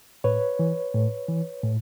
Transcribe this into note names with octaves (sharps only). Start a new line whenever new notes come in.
A2 B4 C#5
E3
A2
E3
A2